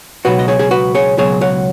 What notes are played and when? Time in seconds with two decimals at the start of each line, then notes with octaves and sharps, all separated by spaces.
0.25 C#2 B2 F#3 F#4 B4
0.39 D#5
0.48 G#4 C#5
0.59 G#4
0.71 F#4 B4
0.95 G#4 C#5
1.18 C#2 B2 F#3 G#4 C#5
1.41 C#5 F#5